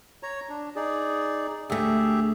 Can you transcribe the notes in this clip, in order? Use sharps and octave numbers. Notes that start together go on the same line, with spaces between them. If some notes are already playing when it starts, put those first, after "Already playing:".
C#5 A#5
D4
D#4 G#4 D5
D2 A3 G4 G#4 E5